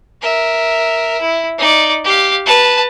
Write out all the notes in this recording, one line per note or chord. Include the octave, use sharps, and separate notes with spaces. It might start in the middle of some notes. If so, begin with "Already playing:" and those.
A#4 E5
E4
D#4 D5
G4 F5
B4 A5